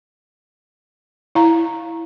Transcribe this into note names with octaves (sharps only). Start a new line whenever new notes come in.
E4 F5 A#5